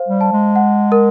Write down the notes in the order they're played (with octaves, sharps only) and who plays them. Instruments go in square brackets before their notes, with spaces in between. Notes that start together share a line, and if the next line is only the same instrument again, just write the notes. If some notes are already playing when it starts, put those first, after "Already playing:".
Already playing: [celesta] C5 F5
[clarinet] G3
[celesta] A5
[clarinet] G#3
[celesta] F#5
A#4